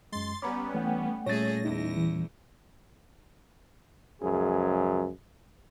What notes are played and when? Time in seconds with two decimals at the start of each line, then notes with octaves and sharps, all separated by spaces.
0.12 F#2 G#3 C6 A6
0.42 G3 B3 C#4 A#5 B5 D6
0.74 E3 A3 F#5 G5
1.26 A#2 G3 A3 C#4 G#4 C#5 A6 A#6
1.65 E2 D#4
1.97 E3
4.22 C#2 F#2 F3 G#4